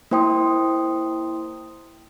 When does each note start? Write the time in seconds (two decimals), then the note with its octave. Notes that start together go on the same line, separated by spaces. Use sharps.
0.11 A#3 E4 C5 G5 C6 D#6